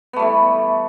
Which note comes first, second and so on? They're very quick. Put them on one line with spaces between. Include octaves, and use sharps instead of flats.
B3 A3 G3 E3